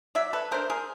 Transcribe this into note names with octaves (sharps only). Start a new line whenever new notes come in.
F#3 D5 E5
A4 B4
A3 D4 A#4 C5
G#4 A#4